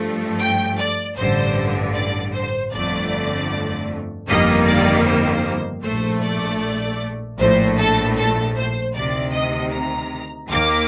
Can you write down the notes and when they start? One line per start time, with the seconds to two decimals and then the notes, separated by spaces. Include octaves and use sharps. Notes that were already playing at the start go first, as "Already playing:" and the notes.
Already playing: G2 F3 A3
0.39 G5
0.78 D5
1.16 A1 G2 D3 C5
1.94 D5
2.33 C5
2.72 G1 F2 D3 A3 D5
4.27 G1 F2 D#3 G3 A#3 D#5
4.66 D5
5.05 C5
5.83 A#1 A2 A3 C5
6.22 D5
7.38 A#1 A2 A3 C5
7.77 A4
8.16 A4
8.55 C5
8.94 D2 C3 D#3 D5
9.33 D#5
9.72 A#5
10.50 D#2 D#3 A#3 D6